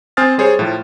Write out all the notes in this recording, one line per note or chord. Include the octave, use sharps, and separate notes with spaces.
C4 C5 G#5 D#6 F6 A6
G3 G#4 C5 C#5
A2 F3